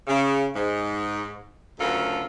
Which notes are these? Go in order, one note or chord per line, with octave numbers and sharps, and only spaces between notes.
C#3
G#2
D2 C#3 F#3 F4 A4 A#4